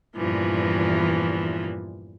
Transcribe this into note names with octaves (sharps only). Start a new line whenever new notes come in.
E2 G2 A#2 E3 F3